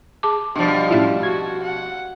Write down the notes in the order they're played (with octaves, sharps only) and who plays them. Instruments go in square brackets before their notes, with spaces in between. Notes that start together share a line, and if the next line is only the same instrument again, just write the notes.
[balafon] G#4 A5 D6
[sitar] B2 F3 [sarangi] G3 [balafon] D4
[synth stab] A2 E4 F4 [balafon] C#4 G4
[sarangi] F#4 [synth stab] G#6
[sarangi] F#5